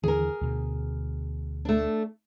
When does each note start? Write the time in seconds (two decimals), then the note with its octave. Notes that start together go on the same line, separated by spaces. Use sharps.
0.04 D#2 D3 E3 G#4 A#4
0.41 D2 B2
1.65 A3 D4